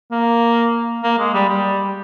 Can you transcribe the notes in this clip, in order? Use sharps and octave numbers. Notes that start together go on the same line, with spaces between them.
A#3
A#3
G#3
G3
G3